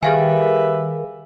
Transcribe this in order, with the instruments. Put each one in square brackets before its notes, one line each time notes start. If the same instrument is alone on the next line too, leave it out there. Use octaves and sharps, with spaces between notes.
[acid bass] D#3 [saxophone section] G3 B4 E5 [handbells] G#4 F5 G#5